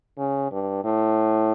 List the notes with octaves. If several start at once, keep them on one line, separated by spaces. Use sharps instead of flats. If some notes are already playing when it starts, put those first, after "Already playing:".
C#3
G2
A2